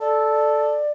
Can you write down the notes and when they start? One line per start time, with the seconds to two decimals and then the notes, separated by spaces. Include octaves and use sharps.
0.01 A4 D5